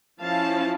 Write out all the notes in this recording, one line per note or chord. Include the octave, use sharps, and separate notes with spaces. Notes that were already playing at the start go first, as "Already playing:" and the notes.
F3 C#4 E4 F5 A5